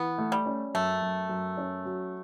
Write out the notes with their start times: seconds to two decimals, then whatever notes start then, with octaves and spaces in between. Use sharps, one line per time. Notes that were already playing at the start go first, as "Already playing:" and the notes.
Already playing: E3 B3
0.18 A3
0.32 G3
0.46 C#4
0.74 F#2 A3
1.02 F#2
1.29 F#2
1.57 C#4
1.85 F#3